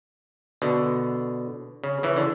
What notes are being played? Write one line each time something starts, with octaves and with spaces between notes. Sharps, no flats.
B2 D3
C#3
C#3 E3
D3